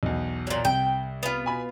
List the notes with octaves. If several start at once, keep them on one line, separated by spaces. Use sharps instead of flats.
B1 E2
A#2 F#3
C2 G5
B3 F4
B2 G#5 B5